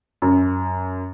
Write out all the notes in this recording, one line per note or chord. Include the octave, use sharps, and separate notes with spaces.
F#2